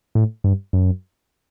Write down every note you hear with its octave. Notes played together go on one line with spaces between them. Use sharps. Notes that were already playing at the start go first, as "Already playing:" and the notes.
A2
G2
F#2